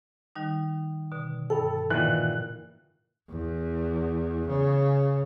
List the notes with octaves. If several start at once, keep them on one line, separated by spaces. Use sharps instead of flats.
D#3 G3 D#4
B2 D3
G2 A4 G5
A#2 D#3 E3 F#6
E2
C#3